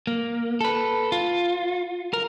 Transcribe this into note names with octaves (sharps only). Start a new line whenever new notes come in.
A#3
A4 B4
F4
A#4